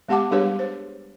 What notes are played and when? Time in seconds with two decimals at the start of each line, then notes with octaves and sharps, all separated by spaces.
0.09 G#3 B3 G4 F#5 A5 D6
0.31 G3 D4 G4 G#4 B4 C#5
0.59 C5